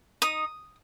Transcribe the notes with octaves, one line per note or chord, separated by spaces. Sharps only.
D#4 D#6